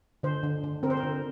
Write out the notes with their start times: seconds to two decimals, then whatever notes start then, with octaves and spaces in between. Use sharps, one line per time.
0.23 D3 C5
0.43 D3
0.64 D3
0.83 C4 A#4
0.90 C5
0.97 A#4
1.03 D3